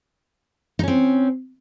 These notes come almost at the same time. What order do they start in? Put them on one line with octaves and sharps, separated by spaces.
D#4 C#4 C4